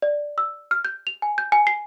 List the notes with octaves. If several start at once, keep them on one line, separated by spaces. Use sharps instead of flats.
D5
E6
F6
G6
F7
G#5
G6
G#5
C7